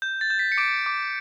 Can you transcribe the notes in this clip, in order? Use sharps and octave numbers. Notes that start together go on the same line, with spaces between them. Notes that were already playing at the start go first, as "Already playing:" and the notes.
G6
A6
G6
B6
C#7
D6 D7
D6